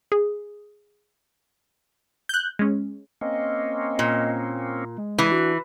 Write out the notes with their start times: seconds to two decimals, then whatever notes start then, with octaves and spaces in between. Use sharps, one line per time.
0.12 G#4
2.29 F#6 G6
2.59 G#3 C#4
3.21 A#3 C4 C#4 D#5
3.99 A#2
4.98 G#3
5.18 E3 G#4 D#5
5.32 D4 F#4